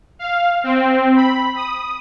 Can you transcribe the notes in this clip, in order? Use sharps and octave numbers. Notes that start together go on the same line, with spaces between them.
F5
C4
B5
D#6